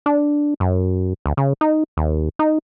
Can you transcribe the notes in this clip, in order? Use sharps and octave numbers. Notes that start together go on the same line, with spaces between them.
D4
F#2
D2
C#3
D#4
D#2
D#4